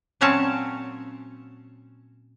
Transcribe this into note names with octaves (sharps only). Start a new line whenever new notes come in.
A#2 F#3 C4 C#4 C#5 A5